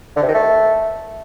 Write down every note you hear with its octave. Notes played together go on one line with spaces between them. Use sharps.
D3
C3
D#3
A3